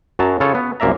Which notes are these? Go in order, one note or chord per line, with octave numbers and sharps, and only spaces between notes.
F#2 F#3 A5 A#5
C#3 F4 A4 C#5
B3
C2 F#2 A#3 D5 E5 A#5